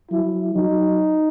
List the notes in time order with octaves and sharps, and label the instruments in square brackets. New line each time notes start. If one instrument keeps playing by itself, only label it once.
[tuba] F#3 [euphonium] E4
[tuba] F#3 [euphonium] D#4